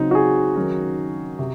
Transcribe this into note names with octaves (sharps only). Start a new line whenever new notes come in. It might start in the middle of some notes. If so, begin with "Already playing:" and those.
Already playing: C#3 F#3 C4 D#4
F#4
G#4
D#3 F#3 C#4
C3